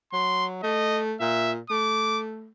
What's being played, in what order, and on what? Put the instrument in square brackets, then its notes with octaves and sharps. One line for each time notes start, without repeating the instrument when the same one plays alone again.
[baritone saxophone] F#3 [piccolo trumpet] C6
[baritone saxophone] A3 [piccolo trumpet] D#5
[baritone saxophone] A#2 [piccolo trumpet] E5
[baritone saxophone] A3 [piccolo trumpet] D6